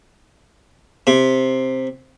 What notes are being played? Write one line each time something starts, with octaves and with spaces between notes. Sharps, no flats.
C3